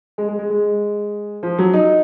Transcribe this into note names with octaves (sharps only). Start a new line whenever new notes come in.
G#3
G#3
G#3
G#3
F3
F#3
D#4